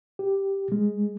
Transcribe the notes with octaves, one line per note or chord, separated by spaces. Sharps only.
G4
G#3